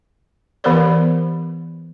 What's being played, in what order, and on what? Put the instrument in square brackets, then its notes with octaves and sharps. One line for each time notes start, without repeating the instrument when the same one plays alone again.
[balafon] E3 B3 G4 A#4 C5 D5